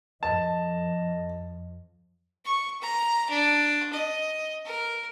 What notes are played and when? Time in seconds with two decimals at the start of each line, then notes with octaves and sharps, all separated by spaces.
0.23 F2 F3 D#5 A5
2.45 C#6
2.81 A#5
3.30 D4
3.93 D#5
4.65 A#4